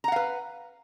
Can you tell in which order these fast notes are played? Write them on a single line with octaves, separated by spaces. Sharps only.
A#5 F#5 F5 B4